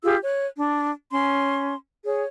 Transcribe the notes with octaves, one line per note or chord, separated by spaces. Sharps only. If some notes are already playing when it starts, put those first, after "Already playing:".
F4 G4 G#4 E6
C#5 F#6
D4
C#4 C6
G#4 C#5